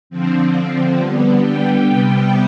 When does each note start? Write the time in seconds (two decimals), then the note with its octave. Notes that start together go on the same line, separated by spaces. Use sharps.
0.10 D3 F3 C4
0.97 D3 G3 B3
1.41 G5
1.85 C3 G3 B3